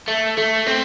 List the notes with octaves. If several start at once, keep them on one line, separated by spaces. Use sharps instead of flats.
A3
A3
C4